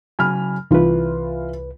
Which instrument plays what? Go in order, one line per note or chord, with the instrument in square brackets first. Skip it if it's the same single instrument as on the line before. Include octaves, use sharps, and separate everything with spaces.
[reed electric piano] C#3 F#3 G#5 [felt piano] B5 F6
[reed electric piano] C2 B4 [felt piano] E3 F4